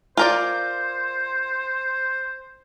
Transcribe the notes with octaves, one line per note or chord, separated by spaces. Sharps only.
F4 A#4 C5 D5